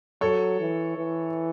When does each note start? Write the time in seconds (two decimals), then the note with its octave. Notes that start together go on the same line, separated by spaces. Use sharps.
0.21 F#3 A4 C#5
0.60 E3
0.98 E3